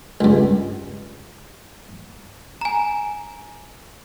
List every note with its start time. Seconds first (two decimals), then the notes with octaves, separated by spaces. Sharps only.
0.21 C#2 G2
2.61 G#5 A#5